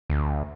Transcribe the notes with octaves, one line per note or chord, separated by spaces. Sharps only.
D2